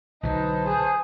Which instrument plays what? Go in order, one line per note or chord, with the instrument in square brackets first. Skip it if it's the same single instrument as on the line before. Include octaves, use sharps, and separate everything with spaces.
[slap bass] B1 D3 F#3 [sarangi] D#4 [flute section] B4 C5 A5
[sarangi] G#4